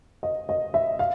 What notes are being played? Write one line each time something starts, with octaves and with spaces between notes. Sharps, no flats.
D#5
D#5
E5
F5